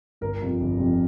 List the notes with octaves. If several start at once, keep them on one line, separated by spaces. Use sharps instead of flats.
G1 A#4
F2 C3 F3
G1
F2 C3 F3